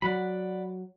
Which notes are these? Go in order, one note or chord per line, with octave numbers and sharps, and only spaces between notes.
F#3 D5 F#5 B5